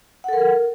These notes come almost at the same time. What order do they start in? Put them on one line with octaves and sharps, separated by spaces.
F#5 A4 A#4